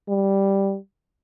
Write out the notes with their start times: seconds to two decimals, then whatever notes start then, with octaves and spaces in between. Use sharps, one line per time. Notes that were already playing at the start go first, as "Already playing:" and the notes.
0.09 G3